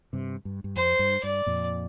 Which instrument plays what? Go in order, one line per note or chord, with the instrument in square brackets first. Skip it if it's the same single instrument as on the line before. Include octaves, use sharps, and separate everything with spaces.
[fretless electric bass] G2 C3
G2
G2
[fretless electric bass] F2 [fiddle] C5
[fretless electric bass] G2
[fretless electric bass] G2 [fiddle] D5
[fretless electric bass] F2 A#2